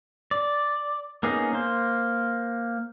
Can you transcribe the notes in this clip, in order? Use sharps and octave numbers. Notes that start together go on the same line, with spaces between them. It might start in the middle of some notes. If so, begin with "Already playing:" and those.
D5
A#3 B3 C#4 D#4 G#4
A#3 C5